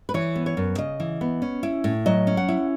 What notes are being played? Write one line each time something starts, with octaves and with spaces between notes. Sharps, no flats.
B4
E3 C#5
B3
C#5
F#2
C#3 D#5
E3
B3
C#4
E4
A2
F#3 D#5
C#4
F#5
E4